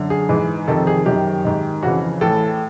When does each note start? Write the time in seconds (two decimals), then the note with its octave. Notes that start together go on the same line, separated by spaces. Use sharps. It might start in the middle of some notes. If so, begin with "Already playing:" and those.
Already playing: F#2 D3
0.10 G#4
0.29 G#2 E3
0.68 F2 C3 D#3 A4
0.87 G#4
1.06 F#2 D#3 G4
1.44 G#2 D#3
1.83 F2 C#3 E3 F#4
2.21 A2 E3 A4